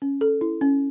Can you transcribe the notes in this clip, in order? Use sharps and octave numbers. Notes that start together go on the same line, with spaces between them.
C#4
A4
E4
C#4